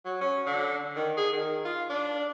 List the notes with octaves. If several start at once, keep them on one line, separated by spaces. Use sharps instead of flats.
F#3
C#4
D3
D#3
G#4
D#3
F4
D4